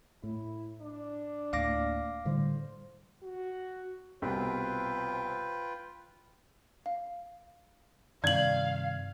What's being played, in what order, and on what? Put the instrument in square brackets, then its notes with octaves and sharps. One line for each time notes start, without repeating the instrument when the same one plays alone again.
[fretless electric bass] A2 [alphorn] E4
[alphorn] D4
[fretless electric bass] D2 A2 A#3 [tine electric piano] F5 D6 A#6
[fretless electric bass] A2 D3 G3 [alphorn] C5
[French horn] F#4
[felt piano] C2 B2 [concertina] F4 B4 G5 [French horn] C5
[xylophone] F5
[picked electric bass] G2 C3 D#3 [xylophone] D5 F#7 [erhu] F5 [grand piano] G#6